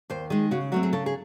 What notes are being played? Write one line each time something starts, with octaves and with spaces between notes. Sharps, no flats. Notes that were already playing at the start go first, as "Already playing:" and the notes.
D#2 C5
D#3 G#3 G#4
C#3 F#4
F#3 A3 C4 F#4
G#4
C#3 A4
G#4